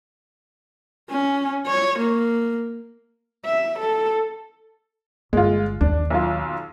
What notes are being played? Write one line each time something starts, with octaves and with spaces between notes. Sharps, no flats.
C#4
C#5
A#3
E5
A4
G1 G#3 F4
D#2 D4
B1 F4